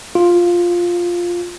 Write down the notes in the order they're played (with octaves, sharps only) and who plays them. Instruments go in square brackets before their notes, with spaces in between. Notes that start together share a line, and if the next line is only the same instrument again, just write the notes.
[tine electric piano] F4